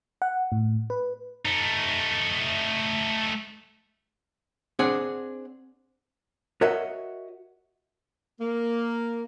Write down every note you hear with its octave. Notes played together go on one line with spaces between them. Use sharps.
F#5
A2
B4
A3 D#4
C4 D4 G#4 F#5
F#4 A#4 C#5 D#5 E5 F#5
A#3